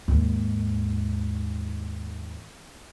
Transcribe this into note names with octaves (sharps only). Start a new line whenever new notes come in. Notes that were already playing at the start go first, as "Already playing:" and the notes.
D#2 G#2